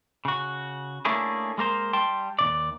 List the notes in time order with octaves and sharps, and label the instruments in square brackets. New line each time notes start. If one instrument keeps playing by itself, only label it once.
[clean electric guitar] C#3 F#4
A3 A#3 C#4 D4 E4 G#4
G#3 A#3 A#4 C5
G3 G5 A5 C6
D#2 C3 D5